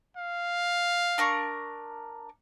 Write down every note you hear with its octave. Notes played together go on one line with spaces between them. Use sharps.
F5
D4 A#4 C#6